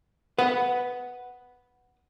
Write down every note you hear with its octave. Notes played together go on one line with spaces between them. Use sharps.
B4 F#5